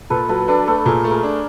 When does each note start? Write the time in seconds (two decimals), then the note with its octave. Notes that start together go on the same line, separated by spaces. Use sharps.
0.10 A#2 A4 B4
0.29 F#3 A4 B4
0.48 D4 A4 B4
0.67 A3 A4 B4
0.85 A#2 G#4 A#4
1.04 A3
1.10 G#4 A#4
1.23 D4